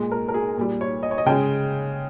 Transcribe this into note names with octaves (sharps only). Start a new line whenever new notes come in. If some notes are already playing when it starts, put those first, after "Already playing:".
Already playing: A#2 G#3
A#4
A#4
G#4
A#2 G3
C#5
D#5
C#5
D#5
C#3 G#3 G5